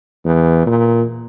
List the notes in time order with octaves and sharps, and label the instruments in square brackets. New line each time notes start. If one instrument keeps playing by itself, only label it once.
[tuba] E2
A#2